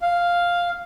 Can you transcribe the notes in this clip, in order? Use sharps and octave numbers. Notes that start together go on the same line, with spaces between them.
F5